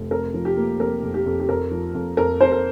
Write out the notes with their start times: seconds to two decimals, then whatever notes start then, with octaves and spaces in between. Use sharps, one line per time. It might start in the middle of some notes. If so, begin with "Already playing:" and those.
Already playing: F1
0.11 F2 A#4
0.34 F3
0.45 G4
0.57 A#3
0.80 F2 A#4
1.03 F2
1.14 G4
1.26 F2
1.40 G4
1.48 F2 A#4
1.71 F3
1.95 F2
2.17 F2 A#4
2.40 F2 C5
2.52 A#4